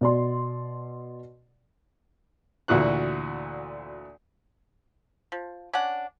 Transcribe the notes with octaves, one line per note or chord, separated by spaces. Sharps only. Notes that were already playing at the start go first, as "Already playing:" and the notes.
B2 D5 C6
D2 A#2 E3 F#4 F#6
F3
C#4 D4 F#5